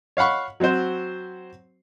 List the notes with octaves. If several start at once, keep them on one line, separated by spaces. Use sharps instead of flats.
C#5 F5 F#5 B5 C#6
F#3 C4 F#4 C5